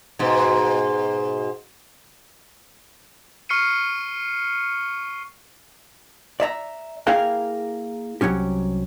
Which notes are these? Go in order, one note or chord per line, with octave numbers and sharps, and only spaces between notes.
G#2 B2
C#6 F6 C7 C#7 D#7
D5 E5 A#5
A#3 E4 G#4 A#4 F5 G5
C2 G#2 F#3 C#4 G4